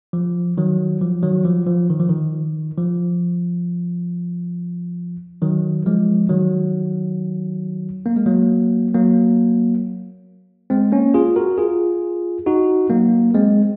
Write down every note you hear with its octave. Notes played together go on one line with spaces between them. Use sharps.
F3
D#3 F#3
F3
D#3 F#3
F3
F3
D#3
F3
D#3
F3
D#3 F#3
F3 G#3
D#3 F#3
A#3
G#3
F#3 A#3
F#3 A#3
G#3 C4
A#3 C#4
F4 G#4
F#4 A#4
F4 G#4
D#4 F#4
F#3 A#3
G#3 C4